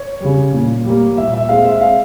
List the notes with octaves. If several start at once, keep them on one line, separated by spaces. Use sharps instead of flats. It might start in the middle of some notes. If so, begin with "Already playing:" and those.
Already playing: C#5
C#3 G3
A#2
G3 A#3
A#2 E5
E5
G#3 C4 F5
E5
F5